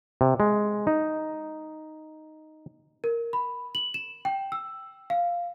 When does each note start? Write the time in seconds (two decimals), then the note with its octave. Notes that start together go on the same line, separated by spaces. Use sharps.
0.21 C3
0.40 G#3
0.87 D#4
3.04 A#4
3.33 B5
3.75 F#7
3.94 E7
4.25 G5
4.52 E6
5.10 F5